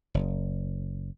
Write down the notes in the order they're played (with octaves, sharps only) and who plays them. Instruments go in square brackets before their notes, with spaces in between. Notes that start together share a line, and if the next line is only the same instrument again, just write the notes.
[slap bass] F#1